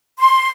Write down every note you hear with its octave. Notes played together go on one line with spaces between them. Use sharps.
C6